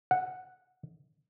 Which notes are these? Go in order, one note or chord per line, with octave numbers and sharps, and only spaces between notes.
F#5